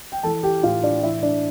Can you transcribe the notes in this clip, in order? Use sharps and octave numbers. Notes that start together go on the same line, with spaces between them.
G5
E3 A4 A5
G4 G5
A2 F4 F5
D4 D5
E3 E4 E5
D4 D5